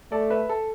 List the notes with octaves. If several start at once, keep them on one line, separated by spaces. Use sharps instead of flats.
A3 A4 D5
B4 E5
A4